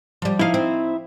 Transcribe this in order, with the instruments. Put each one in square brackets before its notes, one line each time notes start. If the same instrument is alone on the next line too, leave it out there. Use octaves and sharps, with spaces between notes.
[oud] F3 G3
[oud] F3 F5 [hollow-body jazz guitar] D#4 E4
[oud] C4